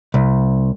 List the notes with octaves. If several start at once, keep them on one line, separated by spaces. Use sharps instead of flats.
C2